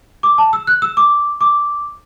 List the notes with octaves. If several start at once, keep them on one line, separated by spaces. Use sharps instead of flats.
D6
A5
E6
F#6
E6
D6
D6